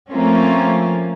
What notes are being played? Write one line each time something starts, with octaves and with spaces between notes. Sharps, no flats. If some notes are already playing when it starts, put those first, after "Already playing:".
F3 A3 A#3 C4 C#4 F4